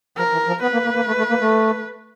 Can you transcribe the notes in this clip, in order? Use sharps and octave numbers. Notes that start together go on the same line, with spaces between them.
F3 A#4
E3
F3
B3 B4
A#3
A#3
A#3
A3
A3
A#3
A3